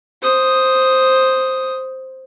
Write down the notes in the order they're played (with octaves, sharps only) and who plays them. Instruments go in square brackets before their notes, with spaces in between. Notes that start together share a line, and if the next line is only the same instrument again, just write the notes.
[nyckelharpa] C5 D#6